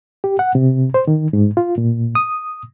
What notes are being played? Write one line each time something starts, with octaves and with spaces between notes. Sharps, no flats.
G4
F#5
C3
C5
D#3
G#2
F4
A#2
D#6